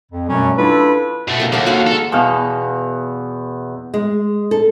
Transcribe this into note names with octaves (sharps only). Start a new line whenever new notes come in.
F2
F#2 B2 F#3 G3 A3 C#4
D4 E4 F4 A4 B4
B2 A3
A#3 G4
D#2 A4 E5 F#5
F#4 F5 F#5
G#3 A4 A#5
E2 B2 F5
G#3
A4